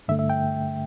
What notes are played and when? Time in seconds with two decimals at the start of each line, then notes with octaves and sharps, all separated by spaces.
0.08 G2 D3 A3 E5
0.19 E5
0.30 G5